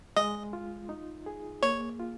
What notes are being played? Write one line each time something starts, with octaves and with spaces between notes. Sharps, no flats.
G#3 D#5
F4
D#4
G#4
A#3 C#5
F4